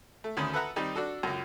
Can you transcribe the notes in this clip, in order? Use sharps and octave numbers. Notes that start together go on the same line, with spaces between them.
A3
D2 D#3 C#4 B5
A4 B4 E5 F#5 A#5
D#3 G3 C4 D#4
D4 F#4 A4
C#2 F#2